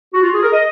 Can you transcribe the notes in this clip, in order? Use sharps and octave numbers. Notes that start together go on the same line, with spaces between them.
F#4
F4
G#4
A#4
D#5